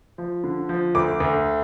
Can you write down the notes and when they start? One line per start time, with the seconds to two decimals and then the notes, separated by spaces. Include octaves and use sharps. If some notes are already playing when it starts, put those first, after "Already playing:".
0.18 F3
0.44 D3
0.69 F3
0.95 D2 D6
1.20 D2